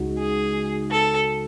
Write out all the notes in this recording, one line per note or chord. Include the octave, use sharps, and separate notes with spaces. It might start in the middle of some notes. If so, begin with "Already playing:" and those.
Already playing: C#2 C#3 G#3 D#4 F#4
G#4
A4